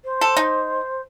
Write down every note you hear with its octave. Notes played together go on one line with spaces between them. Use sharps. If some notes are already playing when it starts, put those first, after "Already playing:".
C5
A4
D#4